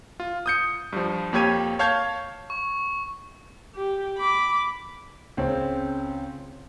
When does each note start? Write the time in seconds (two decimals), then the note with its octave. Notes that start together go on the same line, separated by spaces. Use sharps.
0.20 F4
0.46 D#6 G6 C#7
0.93 G2 F3
1.33 F2 A#3 G4 C#5 G#6 D#7
1.79 C#5 F5 A5 G6 G#6
2.50 C#6
3.75 G4
4.18 B5 D6
5.37 C#2 C4 C#4